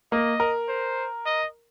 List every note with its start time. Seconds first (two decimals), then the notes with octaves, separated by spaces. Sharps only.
0.12 A#3 D#5
0.40 A#4
0.68 C5
1.26 D#5